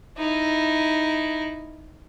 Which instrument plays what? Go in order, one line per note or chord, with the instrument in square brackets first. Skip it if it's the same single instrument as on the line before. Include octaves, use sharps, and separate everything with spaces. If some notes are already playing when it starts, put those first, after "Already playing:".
[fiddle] D#4 E4